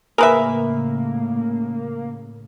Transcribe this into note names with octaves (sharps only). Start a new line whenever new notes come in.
A2 C#3 A#3 G#4 A#4 B4 E5